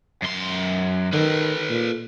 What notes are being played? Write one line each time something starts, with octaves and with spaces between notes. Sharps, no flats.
F#2 C6
D#3 A4 B4
A#2